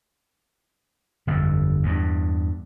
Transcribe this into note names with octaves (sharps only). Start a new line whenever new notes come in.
G1 F2
E2 G2